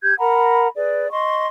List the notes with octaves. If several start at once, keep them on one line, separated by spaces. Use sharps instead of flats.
G4 G6 G#6
A#4 F#5 A#5 B5
G#4 B4 D5
D#5 C6 C#6